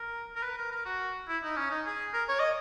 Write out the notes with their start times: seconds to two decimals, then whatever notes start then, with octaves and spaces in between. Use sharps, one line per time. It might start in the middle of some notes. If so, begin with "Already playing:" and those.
Already playing: A#4
0.35 A#4
0.43 B4
0.57 A#4
0.71 A#4
0.85 F#4
1.28 E4
1.43 D#4
1.57 C#4
1.71 D#4
1.86 G#4
2.13 A#4
2.28 C#5
2.40 D#5